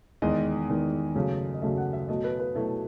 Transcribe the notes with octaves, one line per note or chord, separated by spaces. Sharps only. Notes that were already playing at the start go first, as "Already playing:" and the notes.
E2 D#3 G#3 D#5
E2 D#3 G#3
F#2 C#3 F#3 A3
D#5
F#2 C#3 F#3 A3 E5
F#5
E5
B2 F#3 A3 D#5
B4
B4
B2 F#3 A3 E4